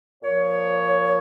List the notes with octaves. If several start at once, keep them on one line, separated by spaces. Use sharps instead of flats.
A#2 F3 A#3 C#5